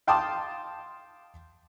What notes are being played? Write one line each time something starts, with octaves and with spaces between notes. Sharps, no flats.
F5 G5 A5 C6 D6 D#6